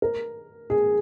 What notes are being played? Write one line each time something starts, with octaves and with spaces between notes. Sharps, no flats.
A#4
G#4